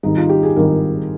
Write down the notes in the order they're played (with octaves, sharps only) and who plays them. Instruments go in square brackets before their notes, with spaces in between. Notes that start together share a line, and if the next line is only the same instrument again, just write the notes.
[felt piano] G#1 G#2 D#3 G3 D#4
F4
G4
G#4
G#1 G#2 D#3 G3 A#4